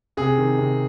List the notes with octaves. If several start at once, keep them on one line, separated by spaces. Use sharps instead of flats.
C3 G#4
D#3
C3